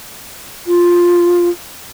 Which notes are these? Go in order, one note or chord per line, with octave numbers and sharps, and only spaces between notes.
F4